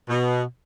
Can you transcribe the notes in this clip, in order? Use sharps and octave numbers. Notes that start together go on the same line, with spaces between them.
B2